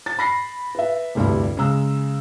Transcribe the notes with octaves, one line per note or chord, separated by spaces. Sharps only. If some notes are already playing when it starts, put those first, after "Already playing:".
A6
B5 A#6 C7
B4 E5
F1 D2 G2 G3 E4
C#3 G#3 A#5 E6